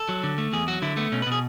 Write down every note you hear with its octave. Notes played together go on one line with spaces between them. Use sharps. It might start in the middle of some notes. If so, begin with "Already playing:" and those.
Already playing: A4
F#3
D3
A3
E2 G#4
F#3 F#4
D3 E4
A3 B3
B2 C#4
B4
B2 G#4